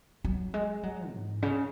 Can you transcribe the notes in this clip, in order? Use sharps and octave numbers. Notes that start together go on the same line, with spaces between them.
F#3
G#3
F#3
G#2
C#3